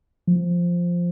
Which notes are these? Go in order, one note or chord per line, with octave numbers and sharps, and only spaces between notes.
F3